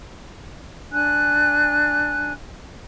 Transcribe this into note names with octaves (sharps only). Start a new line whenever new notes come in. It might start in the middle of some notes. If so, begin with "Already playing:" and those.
D4 G#5 F#6